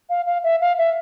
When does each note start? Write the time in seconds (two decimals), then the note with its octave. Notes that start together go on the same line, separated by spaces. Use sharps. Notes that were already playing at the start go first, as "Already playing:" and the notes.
0.10 F5
0.26 F5
0.44 E5
0.61 F5
0.78 E5